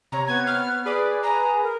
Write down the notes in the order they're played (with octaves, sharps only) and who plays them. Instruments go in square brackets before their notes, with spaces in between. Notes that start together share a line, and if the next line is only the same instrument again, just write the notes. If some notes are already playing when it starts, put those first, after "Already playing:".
[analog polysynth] C3 C#5 [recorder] A#5
[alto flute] B3 [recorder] G#6
[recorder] F6
[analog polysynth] G#4 B4 [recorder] D5
[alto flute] G#5 [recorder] A#5
[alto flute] A#4